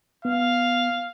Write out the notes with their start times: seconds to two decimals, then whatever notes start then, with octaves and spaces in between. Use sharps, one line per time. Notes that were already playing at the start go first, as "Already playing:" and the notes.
0.25 B3 F5